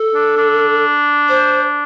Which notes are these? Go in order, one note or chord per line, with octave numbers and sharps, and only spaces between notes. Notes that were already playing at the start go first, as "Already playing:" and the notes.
Already playing: A4
D4
D4
C5